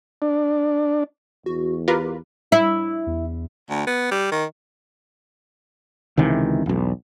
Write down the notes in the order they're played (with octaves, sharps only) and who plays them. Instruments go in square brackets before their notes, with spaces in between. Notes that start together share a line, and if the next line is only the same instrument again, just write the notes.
[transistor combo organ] D4
[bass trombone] E2 [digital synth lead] F#4
[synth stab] F4 A#4 B4 [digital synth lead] G4
[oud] E4
[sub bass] E2
[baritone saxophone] D2
B3
G3
D#3
[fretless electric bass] C#2 C3 D#3 E3
E1 B1